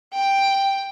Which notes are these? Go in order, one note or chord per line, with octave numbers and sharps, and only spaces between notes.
G5